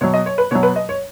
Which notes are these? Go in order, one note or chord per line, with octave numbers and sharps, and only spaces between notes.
B2 F#3 C#5
D#5
C#5
B4
B2 F#3 C#5
B4
D#5
C#5